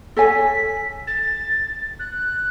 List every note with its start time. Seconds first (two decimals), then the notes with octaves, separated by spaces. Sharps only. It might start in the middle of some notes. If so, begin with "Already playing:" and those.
0.17 A4 C#5 G#5 B6
1.07 A6
1.99 F#6